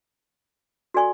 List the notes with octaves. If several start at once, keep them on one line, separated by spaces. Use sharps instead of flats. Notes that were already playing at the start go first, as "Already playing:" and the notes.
F#4 A4 D5 G#5 C#6